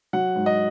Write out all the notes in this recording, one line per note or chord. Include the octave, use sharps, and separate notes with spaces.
F#3 F#5
G#2
D#5